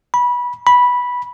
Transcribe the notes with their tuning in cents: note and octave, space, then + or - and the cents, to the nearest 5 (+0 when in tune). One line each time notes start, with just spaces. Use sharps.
B5 -20
B5 -10